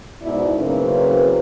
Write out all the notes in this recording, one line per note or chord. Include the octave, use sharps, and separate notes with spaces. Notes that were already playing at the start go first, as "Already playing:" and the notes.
G#2 B2 E4 D5
F#2 C#3 A#3 C4 E4 B4